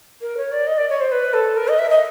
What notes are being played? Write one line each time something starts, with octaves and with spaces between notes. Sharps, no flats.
A#4
C#5
D5
D#5
D5
C#5
C5
B4
A4
A#4
D#5
E5
D#5